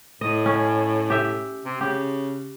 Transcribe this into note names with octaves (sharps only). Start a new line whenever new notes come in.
A2 D#5
C#4
G4 E5
C3
C#3 G4